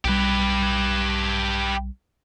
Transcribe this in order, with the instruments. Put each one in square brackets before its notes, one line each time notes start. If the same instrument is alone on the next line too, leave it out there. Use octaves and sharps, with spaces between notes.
[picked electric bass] B1 G3 [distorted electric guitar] G4 B4